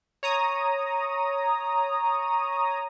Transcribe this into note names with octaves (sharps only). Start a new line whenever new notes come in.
C#5 A#5 D#6